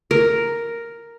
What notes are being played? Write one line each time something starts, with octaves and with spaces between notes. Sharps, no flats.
A#4